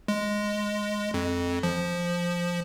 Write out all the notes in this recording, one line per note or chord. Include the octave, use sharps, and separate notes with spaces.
G#3
F2
F3